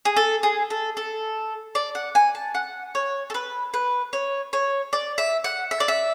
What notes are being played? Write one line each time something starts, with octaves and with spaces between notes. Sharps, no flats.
G#4
A4
G#4
A4
A4
D5
F#5
G#5
A5
F#5
C#5
A4
B4
B4
C#5
C#5
D5
E5
F#5
E5
D5
E5